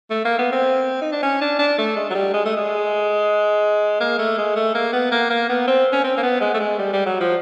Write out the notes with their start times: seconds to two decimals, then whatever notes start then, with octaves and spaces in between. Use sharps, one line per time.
0.11 A3
0.25 A#3
0.39 B3
0.52 C4
1.02 D#4
1.12 D4
1.23 C#4
1.42 D4
1.59 D4
1.78 A3
1.96 G#3
2.10 F#3
2.15 G3
2.34 G#3
2.45 A3
2.57 G#3
4.01 A#3
4.19 A3
4.38 G#3
4.56 A3
4.75 A#3
4.93 B3
5.12 A#3
5.30 A#3
5.49 B3
5.68 C4
5.93 C#4
6.04 C4
6.17 A#3
6.23 B3
6.41 G#3
6.54 A3
6.60 G#3
6.79 G3
6.93 G3
7.06 F#3
7.20 F3